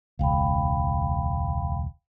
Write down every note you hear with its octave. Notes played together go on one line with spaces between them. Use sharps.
E1 C#2 F5 G5 B5